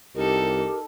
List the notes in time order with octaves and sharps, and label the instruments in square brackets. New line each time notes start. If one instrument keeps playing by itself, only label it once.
[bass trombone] C2 [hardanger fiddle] D#4 A4 [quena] G4 [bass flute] A#4